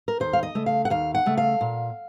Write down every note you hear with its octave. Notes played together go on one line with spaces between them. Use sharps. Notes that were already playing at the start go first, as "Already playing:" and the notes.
A#4
D#2 C5
F5
D#5
C#3 A3
F5
F#5
D#2 F5
F#5
C#3 A3
F5
A#2